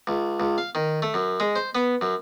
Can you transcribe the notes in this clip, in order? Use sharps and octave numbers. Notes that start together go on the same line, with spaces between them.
C#2
C#2
F5
D#3
A3
F#2
G#3
C5
B3
F#2